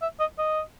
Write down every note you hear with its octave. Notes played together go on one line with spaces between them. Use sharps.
E5
D#5
D#5